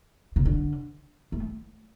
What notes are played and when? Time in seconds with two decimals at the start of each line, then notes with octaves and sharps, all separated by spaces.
0.36 C#3
0.45 D3
1.32 A3